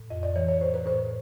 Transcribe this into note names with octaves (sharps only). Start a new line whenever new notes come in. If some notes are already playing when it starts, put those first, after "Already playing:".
Already playing: A2
F2 D#5
D5
E3 C#5
C#5
A2 C5
B4
A2 C5